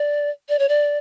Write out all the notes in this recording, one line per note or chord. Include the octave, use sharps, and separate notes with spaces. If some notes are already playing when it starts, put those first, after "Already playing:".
Already playing: D5
D5
C#5
D5